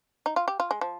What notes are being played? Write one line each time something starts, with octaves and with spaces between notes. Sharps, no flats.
D#4
F4
G4
F4
G#3
F3